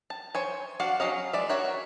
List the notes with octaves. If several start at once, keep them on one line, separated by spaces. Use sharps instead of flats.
A5
C5 C#5 G#5
D4 F#4 F5 F#5
F#3 C#4 D#5 F5
G#3 D5 E5
F#4 A#4 C#5 E5 F#5